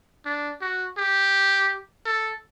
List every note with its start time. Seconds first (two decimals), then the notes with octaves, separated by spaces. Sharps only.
0.25 D4
0.61 F#4
0.98 G4
2.06 A4